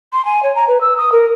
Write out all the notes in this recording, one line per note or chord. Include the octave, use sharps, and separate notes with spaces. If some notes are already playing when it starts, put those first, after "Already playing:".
C6
G#5
C#5
A#5
B4
E6
D#6
A#4